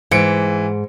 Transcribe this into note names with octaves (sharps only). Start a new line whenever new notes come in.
G#2 E3 C#7 D7